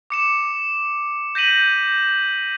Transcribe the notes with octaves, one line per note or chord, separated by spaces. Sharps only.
D6 C#7 E7
G6 A#6 B6 D#7 F#7